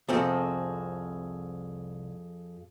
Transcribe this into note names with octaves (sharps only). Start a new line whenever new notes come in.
C2 F2 C4 G#4 A4